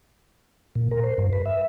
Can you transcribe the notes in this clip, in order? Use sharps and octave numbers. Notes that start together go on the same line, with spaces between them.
A#2
A#4
C5
G2
B4
E5